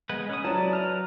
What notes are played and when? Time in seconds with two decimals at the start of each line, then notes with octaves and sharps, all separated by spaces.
0.09 G#3 B3 B4
0.29 C#4 D#6
0.44 F#3 E4 D5 A5
0.73 B4 A#5 F6